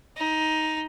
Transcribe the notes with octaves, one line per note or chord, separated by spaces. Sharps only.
D#4